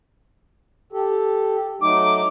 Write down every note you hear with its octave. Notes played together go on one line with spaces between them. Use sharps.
G4 A4
F#3 A3 D#4 D6